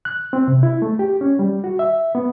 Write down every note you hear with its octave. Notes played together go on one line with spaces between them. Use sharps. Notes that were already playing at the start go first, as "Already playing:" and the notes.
F#6
C4
C3
E4
A3
G4
C#4
G3
F#4
E5
B3